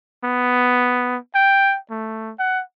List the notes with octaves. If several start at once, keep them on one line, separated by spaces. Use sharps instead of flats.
B3
G5
A3
F#5